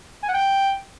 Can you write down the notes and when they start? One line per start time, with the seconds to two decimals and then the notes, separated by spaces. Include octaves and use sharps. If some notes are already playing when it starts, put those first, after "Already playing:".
0.23 G#5
0.28 F#5
0.34 G5